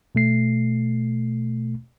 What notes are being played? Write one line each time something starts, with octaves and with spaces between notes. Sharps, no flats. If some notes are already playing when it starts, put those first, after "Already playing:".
B2 A3 C7